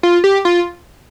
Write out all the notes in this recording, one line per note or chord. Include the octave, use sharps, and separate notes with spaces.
F4
G4
F4